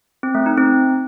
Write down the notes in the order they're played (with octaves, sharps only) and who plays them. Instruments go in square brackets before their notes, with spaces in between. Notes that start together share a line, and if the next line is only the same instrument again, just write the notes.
[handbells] C4
A3
D#4
C4